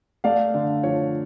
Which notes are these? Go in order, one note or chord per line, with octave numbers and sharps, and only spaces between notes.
A3 D5 F5
D3 D5
F3 C#5